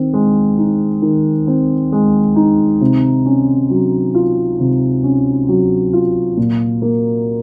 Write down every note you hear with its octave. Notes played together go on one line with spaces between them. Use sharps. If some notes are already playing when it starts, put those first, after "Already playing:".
Already playing: D#3 C4
G#3
D#4
D#3
C4
G#3
D#4
C3
C#4
F#3
F4
C3
C#4
F#3
F4
A#2
A#3